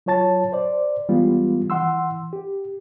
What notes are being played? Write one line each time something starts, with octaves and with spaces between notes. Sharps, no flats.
F#3 F4 C#5 A5 A6
C5 D5
E3 G3 G#3 B3 F4
E3 F#5 C6 E6
G4